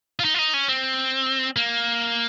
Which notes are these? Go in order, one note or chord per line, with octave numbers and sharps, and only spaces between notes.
F4
D#4
F4
D#4
C#4
C4
A#3